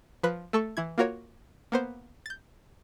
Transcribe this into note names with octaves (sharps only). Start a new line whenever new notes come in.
F3 B4 F#6
A3 A4 C#6
E3 E4 G#6
A#3 F4 F#4 A#4 C#5
A#3 B3 C5
G6 A6